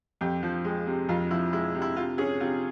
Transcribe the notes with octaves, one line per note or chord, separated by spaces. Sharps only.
F2 G4
F3
G#3
C3
F2 F4
F3 E4
G#3 E4
C3
E4
C3 F4
C#4 G#4
C3 F4